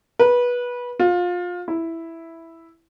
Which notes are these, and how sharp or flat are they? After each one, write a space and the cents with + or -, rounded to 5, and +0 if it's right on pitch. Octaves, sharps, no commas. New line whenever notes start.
B4 -20
F4 +25
E4 +0